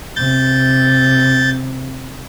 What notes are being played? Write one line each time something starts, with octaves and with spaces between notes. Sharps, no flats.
C3 G6 A6